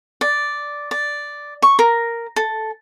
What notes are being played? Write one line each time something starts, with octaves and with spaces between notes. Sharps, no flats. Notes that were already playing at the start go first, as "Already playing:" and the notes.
D5
D5
C#6
A#4
A4